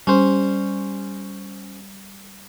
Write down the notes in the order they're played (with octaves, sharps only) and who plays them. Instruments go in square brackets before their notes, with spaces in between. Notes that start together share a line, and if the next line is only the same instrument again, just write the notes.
[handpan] G3 [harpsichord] C#4 C5